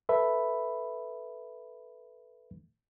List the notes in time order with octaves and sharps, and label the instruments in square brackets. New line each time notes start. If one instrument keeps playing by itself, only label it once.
[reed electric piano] A4 B4 E5 B5